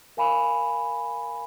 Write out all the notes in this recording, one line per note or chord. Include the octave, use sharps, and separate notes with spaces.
A#4 F5 G#5 B5